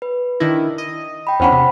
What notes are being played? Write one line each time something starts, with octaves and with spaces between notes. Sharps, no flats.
B4
D#3 D4 E4 A#6
D#5
G5 B5
E2 C#4 D4 C5 F#5 B5
C3